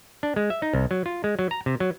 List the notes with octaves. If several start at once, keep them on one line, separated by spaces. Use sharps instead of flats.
D4
G#3
E5
D#4
C2
F#3
F4
G#3
F#3
A#5
C3
F#3